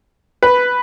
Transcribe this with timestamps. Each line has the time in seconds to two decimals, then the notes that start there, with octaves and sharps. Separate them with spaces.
0.43 B4